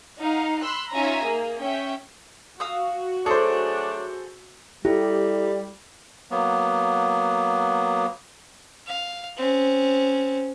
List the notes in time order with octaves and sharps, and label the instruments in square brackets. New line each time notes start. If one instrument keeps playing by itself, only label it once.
[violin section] D#4 F5 F#5
B5 C6 E6 F#6
C#4 D#4 F4 E5 G#5 A#5
A#3 G#4
C#4 E5 G5
[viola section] F#4 [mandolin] F5 D#6 E6
[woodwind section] F#3 A3 D4 [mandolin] G#4 [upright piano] A4 C5
[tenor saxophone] G3 [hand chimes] E4 A4 [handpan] G4
[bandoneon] F#3 A#3 B3
[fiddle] F5
C4 C#4